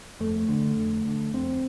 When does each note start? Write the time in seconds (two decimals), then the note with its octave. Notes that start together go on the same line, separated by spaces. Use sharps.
0.20 F2 A3
0.49 D3
0.77 F2
1.05 D3
1.33 F2 C4